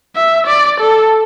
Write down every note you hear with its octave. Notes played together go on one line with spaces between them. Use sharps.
E5
D5
A4